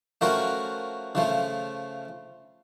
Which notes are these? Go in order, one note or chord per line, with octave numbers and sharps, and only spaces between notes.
F3 A3 C#4 F#4 A#4
C#3 F3 A3